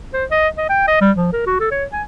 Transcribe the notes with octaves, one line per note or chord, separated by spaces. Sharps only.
C5
D#5
D#5
G5
D#5
G3
F3
A#4
F#4
A4
C#5
G#5